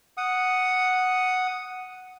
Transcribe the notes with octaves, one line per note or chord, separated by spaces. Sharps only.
F#5 D#6